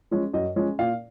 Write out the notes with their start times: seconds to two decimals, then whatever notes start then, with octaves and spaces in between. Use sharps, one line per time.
0.11 F3 G#3 C#4
0.34 F#2 D#5
0.56 F3 G#3 C#4
0.79 A#2 F5